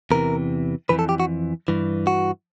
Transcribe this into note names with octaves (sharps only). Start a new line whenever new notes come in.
E2 C3 E3 A#4
F2 C#3 E3 B4
A4
G4
F#4
G2 E3
F#4